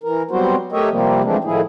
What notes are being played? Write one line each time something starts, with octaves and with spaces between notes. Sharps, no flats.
E3 A#4
F#3 G3 B3 C4 F#4 C5
A3 G4 A#4 C#5 D#5 E5
C3 F3 G3 A#3 C4
E3 F3 G#3 A3 C4 D4
A2 D#3 F3 E4 G#4